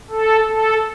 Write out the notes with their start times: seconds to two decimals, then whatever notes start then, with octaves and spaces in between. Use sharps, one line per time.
0.10 A4
0.48 A4